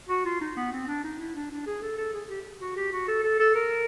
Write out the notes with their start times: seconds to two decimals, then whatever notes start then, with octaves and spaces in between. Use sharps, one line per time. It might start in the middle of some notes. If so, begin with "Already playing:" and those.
0.09 F#4
0.25 F4
0.41 D#4
0.57 B3
0.73 C4
0.88 D4
1.04 D#4
1.19 E4
1.35 D4
1.51 D4
1.66 G#4
1.82 A4
1.98 A4
2.14 G#4
2.29 G4
2.61 F#4
2.77 G4
2.92 F#4
3.08 A4
3.24 A4
3.39 A4
3.55 A#4